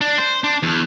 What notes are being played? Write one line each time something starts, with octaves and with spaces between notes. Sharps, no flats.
D4
C5
D4
E2